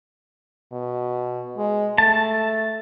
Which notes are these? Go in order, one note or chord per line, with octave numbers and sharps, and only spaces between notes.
B2
G#3
A3 A5